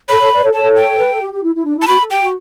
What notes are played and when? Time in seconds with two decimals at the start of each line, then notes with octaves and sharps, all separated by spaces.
0.09 A4 C#5 B5
0.20 A4 C#5
0.31 B4 D5
0.42 A4 C#5
0.53 A4 C#5 A5
0.76 G5
0.98 B4
1.10 A4
1.21 G4
1.32 G4
1.43 E4
1.54 E4
1.65 D4
1.77 E4
1.82 A5
1.88 F#4 B5
1.99 A4
2.10 G4 G5
2.22 F#4